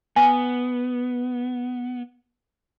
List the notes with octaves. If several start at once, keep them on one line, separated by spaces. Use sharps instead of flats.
B3 G#5